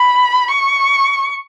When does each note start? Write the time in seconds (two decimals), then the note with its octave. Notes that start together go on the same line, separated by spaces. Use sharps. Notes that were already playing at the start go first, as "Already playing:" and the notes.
Already playing: B5
0.48 C#6